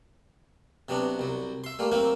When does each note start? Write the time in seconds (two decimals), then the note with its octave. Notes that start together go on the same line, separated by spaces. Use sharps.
0.89 C3 F#3 B3 D4
1.19 C2 F#3
1.64 E5 C6
1.79 G3 A3 A#3
1.92 F#3 A#3 C4 E4